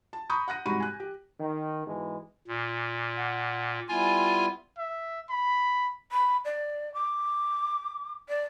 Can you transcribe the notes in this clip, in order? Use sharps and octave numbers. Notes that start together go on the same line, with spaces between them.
A5
A#5 B5 C#6 D#6 G6
F#5 F#6 A#6 D#7
C2 G#2 F#4 B5 C#6 D#7
G#5 F#6
G4
D#3
G#2 B2 E3 G#3
A#2
F#5
G3 B3 E4 F4 G#5
E5
B5
B5
D5
D6
D5